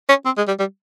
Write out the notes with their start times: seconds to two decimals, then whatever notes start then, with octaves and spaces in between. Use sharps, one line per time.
0.09 C#4
0.25 C4
0.37 G#3
0.48 G3
0.59 G3